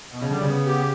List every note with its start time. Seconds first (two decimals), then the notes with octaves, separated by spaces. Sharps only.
0.11 B2
0.22 C#3
0.30 D3 G3
0.41 C#3
0.48 B3
0.66 G4